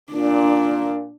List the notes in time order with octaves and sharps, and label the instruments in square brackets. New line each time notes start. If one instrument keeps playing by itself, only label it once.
[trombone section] A#2 [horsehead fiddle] D4